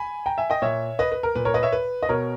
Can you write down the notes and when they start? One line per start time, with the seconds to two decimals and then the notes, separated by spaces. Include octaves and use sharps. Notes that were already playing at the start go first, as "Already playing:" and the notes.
Already playing: G#5 B5
0.26 G5 A#5
0.38 E5 G#5
0.50 D#5 G5
0.62 A#2 C#5 E5
0.99 B4 D#5
1.12 B4
1.23 A#4
1.35 A#2 B4
1.45 A#4 C#5
1.54 B4 D#5
1.63 C#5 E5
1.72 B4
2.03 D#5
2.09 B2 A#4 C#5